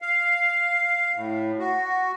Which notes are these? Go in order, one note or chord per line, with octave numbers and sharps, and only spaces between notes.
F5
A2
F#4